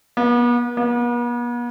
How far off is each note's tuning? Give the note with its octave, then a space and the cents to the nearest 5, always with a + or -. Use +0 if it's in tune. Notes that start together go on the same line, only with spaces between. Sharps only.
B3 -40
B3 -45